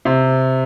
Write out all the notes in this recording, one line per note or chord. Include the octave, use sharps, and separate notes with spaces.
C3